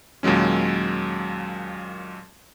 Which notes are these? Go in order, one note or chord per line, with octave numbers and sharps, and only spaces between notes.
D#2 A#2 F#3 G#3 C#4